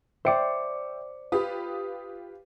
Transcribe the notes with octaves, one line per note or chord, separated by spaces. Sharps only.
C5 D5 E5 G5 C#7
F4 G4 B4 D#6